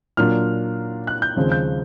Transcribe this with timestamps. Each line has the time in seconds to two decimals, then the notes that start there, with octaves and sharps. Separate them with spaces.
0.17 A#2 F#3 A#3 D4 F4 F6
1.07 F#6
1.22 G6
1.37 D#2 C#3 F3 G#3 C4
1.52 G6